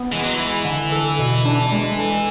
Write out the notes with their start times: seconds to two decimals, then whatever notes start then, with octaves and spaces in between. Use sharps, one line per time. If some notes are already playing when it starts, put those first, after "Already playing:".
Already playing: B3
0.12 E3 G#3
0.23 F#3
0.34 E3 E4
0.65 D3
0.92 A4
1.19 B2
1.45 D4
1.72 G#3
1.99 A4